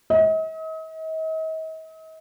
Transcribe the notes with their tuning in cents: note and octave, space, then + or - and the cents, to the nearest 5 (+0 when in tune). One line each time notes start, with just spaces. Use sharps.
D#5 +40